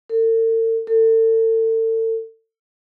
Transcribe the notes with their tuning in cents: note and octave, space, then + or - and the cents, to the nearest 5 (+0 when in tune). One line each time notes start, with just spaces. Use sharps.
A4 +45
A4 +35